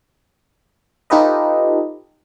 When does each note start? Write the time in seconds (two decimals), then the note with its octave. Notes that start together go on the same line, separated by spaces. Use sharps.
1.10 D#4 F4 G4 A4 B4 D#5